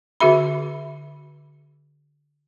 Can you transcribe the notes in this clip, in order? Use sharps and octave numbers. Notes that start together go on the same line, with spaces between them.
D3 F#4 G#4 E5 B5